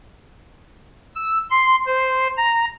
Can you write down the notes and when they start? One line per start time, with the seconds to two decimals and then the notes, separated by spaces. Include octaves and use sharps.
1.16 E6
1.51 C6
1.87 C5
2.37 A#5